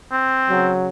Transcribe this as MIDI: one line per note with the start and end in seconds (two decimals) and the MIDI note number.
0.12 0.71 60
0.49 0.88 49
0.49 0.88 54